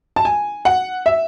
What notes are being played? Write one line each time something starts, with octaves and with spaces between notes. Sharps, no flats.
A5
G#5
F#5
E5